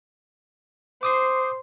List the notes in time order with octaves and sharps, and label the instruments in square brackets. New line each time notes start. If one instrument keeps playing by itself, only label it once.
[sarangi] C5 [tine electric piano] D6 D#6 C7